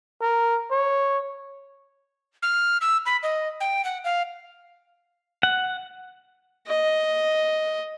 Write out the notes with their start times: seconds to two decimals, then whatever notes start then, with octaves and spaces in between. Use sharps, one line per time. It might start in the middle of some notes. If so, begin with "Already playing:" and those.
0.21 A#4
0.71 C#5
2.42 F6
2.81 E6
3.06 B5
3.23 D#5
3.60 G5
3.85 F#5
4.04 F5
5.43 F#5
6.67 D#5